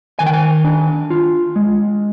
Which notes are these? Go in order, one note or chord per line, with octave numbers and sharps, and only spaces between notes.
D#3 G#5
G5
G#5
D4
F4
G#3